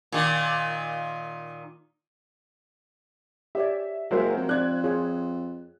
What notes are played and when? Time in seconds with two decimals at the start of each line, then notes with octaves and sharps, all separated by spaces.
0.12 A#2 D#3
3.55 G4 C#5 D5 E5
4.11 F#1 F#3 G#3 A#4 C5 E5 F#5
4.37 F2
4.49 C4 D5 F#6 G#6
4.84 F4 G#4 C#5